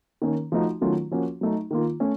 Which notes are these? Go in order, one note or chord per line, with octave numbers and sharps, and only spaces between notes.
D#3 A#3 C#4
F3 A3 D#4 F#4
D#3 F#3 A3 C#4 F4
F3 A#3 C#4 F#4
F#3 A3 D#4
D#3 A#3 F4
A3 C#4